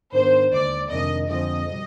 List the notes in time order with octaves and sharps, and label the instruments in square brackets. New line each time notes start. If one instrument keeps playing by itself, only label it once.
[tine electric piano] G#2 D#3 B3 D4 [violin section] C5
[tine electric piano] D#2 D3 G#3 [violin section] D5
[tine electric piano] F2 C3 D#3 G#3 D4 [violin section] D#5
[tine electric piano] F2 D3 F3 G#3 C4 [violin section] D#5
[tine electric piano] B2 G3